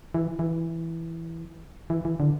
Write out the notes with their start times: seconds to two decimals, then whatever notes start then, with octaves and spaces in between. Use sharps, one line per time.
0.14 E3
0.39 E3
1.90 E3
2.05 E3
2.20 D3